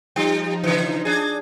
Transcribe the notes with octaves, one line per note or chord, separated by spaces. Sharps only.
F3 G3 D#4
C#3 E3
D4 G#4